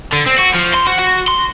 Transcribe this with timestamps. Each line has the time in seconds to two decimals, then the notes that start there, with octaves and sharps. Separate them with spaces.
0.13 D3
0.26 C4
0.38 F#4
0.54 F3
0.74 C6
0.87 F#4
0.99 F#4
1.28 C6